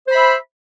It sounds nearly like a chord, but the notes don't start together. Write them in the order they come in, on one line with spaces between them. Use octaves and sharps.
C5 B5 E5